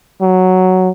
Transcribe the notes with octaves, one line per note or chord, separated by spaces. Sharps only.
F#3